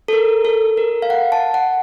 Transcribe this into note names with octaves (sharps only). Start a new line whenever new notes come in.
A4
A#4
A4
A#4
F5
F#5
A5
F#5